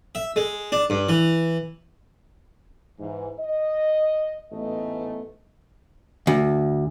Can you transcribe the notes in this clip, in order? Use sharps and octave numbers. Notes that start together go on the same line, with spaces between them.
E5
G#3
D4
G2
E3
G#2 E3
D#5
A1 G#2 A3 B3 D#5
D2